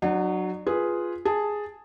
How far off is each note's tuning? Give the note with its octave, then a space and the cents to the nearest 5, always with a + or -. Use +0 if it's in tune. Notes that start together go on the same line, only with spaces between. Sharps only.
F#3 +0 D4 +45
F4 +0 G#4 +0 B4 +0
G#4 +0 A5 +0